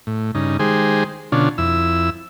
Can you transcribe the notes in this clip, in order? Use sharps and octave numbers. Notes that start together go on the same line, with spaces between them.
A2
G2 C#3 D#4
D#3 G#3 G4 G#4 C5
B2 D3 C#4 D4 F4
F2 E4 E6